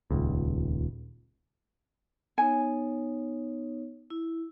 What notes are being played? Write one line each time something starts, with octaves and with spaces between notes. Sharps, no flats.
D#1 C#2
B3 D#4 C#5 G#5
E4